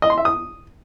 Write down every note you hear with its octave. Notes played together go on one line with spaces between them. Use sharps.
D#5
C6
E5
D#6